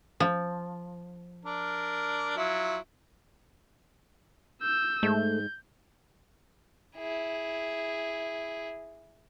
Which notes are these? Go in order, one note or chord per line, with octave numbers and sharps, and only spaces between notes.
F3
D4 A#4
F#3 E4 F4
E6 G6
G#2 A3 G6
E4 G#4